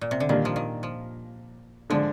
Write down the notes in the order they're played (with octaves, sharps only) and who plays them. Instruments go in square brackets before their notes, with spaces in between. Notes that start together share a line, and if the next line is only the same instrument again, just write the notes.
[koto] A#2
C3
D3
[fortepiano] A#2 G3 A#3 D4 [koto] D#3
[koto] F3
D#3
F3
[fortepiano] D3 G#3 D4 [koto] F3